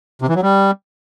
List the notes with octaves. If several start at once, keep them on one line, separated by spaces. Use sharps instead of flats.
C3
E3
F#3
G3